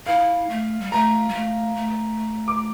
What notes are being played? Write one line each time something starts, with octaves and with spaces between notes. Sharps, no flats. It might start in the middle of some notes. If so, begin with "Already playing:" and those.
E4 F5
A3
G3
A3 A#5
G3
A3
A3
D6